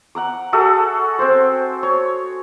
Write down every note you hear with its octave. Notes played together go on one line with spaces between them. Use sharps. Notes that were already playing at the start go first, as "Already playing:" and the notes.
F#5 A#5 D6
F#4 G#4 A4 E5
C4 C5
C#5